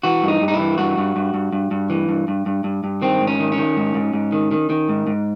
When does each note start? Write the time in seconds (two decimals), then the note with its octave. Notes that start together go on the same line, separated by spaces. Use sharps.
0.03 E3 F#4
0.23 G2
0.28 D#4
0.41 G2
0.48 D#4
0.53 E4
0.60 E3
0.78 G2 F#4
0.98 G2
1.16 G2
1.34 G2
1.53 G2
1.71 G2
1.90 E3
2.09 G2
2.28 G2
2.46 G2
2.64 G2
2.84 G2
3.02 D#3 C4
3.21 G#2
3.27 C#4
3.40 D#3
3.52 C#4
3.57 D#3
3.77 G#2
3.95 G#2
4.13 G#2
4.32 D#3
4.51 D#3
4.70 D#3
4.89 G#2
5.07 G#2